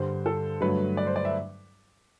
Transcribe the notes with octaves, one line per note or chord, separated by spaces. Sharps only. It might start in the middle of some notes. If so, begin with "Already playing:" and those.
Already playing: G2 D3 G3 C5
A4
G2 D3 F#3 A3 B4
D5
C5
D5
E5